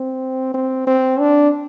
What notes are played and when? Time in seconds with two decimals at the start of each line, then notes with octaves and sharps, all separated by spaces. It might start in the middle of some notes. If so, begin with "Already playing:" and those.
Already playing: C4
0.54 C4
0.87 C4
1.20 D4